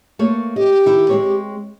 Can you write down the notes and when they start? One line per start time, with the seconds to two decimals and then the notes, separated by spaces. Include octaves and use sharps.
0.19 A3 A#3 C#5
0.56 G4 D#5
0.86 D#3 E4
1.09 G#3 C4 C#5